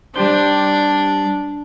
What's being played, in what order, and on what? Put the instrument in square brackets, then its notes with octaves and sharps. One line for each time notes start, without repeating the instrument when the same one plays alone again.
[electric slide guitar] G3 G4 C5 [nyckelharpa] D4